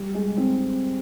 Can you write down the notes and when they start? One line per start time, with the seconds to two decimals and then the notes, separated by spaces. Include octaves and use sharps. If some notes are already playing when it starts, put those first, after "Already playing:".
Already playing: G3
0.14 G#3
0.37 C4